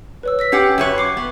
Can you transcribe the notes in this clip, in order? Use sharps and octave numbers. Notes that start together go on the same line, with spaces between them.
B4 C#5 E6
E6 A#6 B6
C#4 G4 F#5 G5 D6 C7
F#2 B4 C#5
C#6 D6 C7
B3